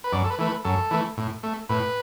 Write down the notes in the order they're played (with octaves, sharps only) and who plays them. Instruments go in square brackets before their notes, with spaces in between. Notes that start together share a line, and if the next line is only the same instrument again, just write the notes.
[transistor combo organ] B4
F#2 D5
A4
B4
E3 A3
B4
F#2 A4
E3 A3
A2
A3
A2 B4